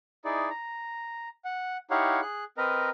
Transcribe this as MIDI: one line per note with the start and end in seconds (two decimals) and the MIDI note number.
0.25 0.49 63
0.25 0.49 64
0.25 0.49 68
0.25 0.49 74
0.50 1.29 82
1.45 1.77 78
1.90 2.21 63
1.90 2.21 64
1.90 2.21 67
1.90 2.21 73
1.90 2.21 77
1.90 2.21 78
2.22 2.44 68
2.22 2.44 90
2.58 2.90 60
2.58 2.90 70
2.58 2.90 71
2.58 2.90 75
2.58 2.90 82